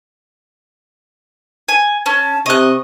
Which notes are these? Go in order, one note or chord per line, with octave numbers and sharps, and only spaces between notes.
G#5
C#4 A5
C3 D#5 C#6 F#6